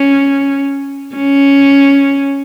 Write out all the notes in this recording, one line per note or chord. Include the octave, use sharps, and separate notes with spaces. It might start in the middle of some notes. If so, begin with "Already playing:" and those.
Already playing: C#4
C#4